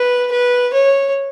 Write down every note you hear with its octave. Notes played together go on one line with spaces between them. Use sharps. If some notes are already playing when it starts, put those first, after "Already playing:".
Already playing: B4
B4
C#5